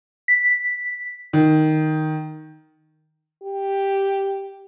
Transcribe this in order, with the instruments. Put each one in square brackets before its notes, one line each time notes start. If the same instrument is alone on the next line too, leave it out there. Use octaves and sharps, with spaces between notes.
[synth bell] B6
[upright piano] D#3
[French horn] G4